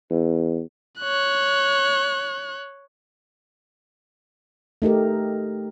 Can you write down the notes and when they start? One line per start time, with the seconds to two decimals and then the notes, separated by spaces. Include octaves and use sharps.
0.11 E2
1.00 C#5 F#6
4.82 A3 D#4 G4 A#4